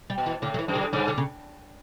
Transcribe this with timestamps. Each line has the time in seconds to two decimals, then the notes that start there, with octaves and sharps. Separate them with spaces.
0.10 G3
0.18 B2
0.26 E3
0.42 A2 D3
0.54 F#3
0.59 E3
0.68 F#2
0.75 D3
0.93 G2 D3
1.08 D3
1.18 C#3